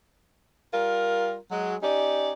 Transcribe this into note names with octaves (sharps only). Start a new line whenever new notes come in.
G3 F4 A#4
F#3 G#3
C#4 D#4 G4 D5